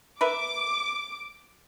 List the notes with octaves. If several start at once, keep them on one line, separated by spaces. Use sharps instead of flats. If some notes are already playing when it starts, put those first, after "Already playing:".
A#4 B4 E5 D6